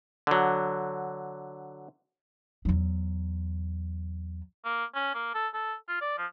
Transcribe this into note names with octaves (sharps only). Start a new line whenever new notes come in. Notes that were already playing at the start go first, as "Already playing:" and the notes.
D3 F#3
E2 F#3
A#3
C#4
A#3
A4
A4
F4
D5
F3